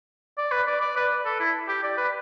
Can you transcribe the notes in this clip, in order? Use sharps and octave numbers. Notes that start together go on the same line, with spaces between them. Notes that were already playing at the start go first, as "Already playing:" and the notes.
D5
B4
D5
D5
B4
A4
E4
G4
D5
B4